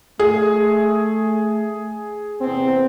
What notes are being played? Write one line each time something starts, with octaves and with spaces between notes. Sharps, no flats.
A3 G#4
E2 C3 C4